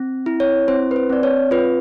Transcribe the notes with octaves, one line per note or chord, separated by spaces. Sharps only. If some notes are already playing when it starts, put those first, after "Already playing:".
Already playing: C4
E4
C#5
C4 C5
B4
C5
C4 D5
C#5
F4 B4